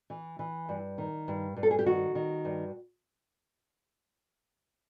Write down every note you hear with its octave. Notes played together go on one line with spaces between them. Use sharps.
E3
E3
G2
D#3
G2
G2
A4
G#4
G4
D#3 F#4
D#3
G2